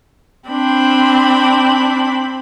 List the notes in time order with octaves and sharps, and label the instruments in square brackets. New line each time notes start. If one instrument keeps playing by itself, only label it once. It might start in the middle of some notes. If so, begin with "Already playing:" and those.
[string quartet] C4 D4 B5